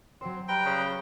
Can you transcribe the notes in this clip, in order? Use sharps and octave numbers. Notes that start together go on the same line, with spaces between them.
F#3 C4 C5
G3 B4 G5 A#5 B5
C#3